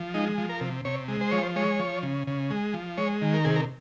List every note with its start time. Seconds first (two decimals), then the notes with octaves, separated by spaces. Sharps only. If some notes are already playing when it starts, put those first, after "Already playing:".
Already playing: F3
0.14 G#3 D#4
0.38 F3
0.49 A#4
0.61 C3
0.85 C3 C#5
1.08 G#3
1.21 C5
1.31 F3 C#5
1.43 C5
1.56 G#3 C#5
1.80 F3
2.03 C#3
2.27 C#3
2.50 G#3
2.74 F3
2.98 G#3 C#5
3.22 D#3
3.34 A#4
3.45 C3 G#4
3.56 A#4